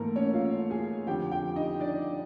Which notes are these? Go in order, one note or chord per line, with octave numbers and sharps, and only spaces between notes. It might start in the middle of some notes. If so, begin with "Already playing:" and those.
Already playing: G#2 E3 A3 A#3 A4 A#4
C#4 C#5
F4 F5
G#4 G#5
F2 D3 F3 G4 G5
G4 G5
D#4 D#5
D4 D5